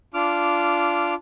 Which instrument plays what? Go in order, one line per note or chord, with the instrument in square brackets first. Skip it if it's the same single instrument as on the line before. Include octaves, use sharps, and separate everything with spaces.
[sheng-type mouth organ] D4 F4 D6 F6